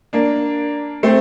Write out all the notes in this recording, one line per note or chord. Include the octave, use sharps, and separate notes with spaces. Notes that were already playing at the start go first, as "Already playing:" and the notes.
A#3 D4
A3 C4